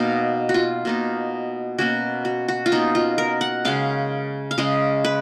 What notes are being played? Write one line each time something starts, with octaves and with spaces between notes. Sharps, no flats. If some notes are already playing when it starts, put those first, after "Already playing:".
Already playing: B2 A#3 D#4 F5
F#4
F4
B2 A#3 D#4
B2 A#3 C#4 F#4
F#4
F#4
F4
B2 A#3 C#4 D#4
F4
A#4
F#5
C#3 G#3 C#4 F5
F5
C#3 G#3 C#4 D#5
B4